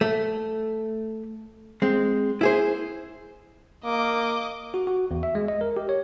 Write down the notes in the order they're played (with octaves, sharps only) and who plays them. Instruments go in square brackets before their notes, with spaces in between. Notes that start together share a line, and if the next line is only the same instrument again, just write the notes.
[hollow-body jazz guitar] A3
G#3 C4
E4 G#4 C5
[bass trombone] A#3 [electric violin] D#5 D6
[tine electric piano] F#4
F#4
E2
E5
G#3
D#5
A#4
G4
C#5